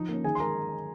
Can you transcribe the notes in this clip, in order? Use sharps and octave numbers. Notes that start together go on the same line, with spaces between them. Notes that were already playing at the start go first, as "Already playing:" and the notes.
Already playing: F3 D#4
A#3 C#4
D#3 G#4 G#5
C6
G#3 A#4 A#5